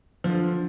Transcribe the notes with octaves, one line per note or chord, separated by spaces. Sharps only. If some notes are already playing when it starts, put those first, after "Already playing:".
D3 F3 F4